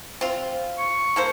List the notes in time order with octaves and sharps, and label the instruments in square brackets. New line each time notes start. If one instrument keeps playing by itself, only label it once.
[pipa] C4 F4
[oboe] C#6
[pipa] A#3 A4 C5